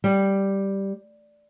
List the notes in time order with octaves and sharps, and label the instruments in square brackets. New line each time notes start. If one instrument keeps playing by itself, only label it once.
[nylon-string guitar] G3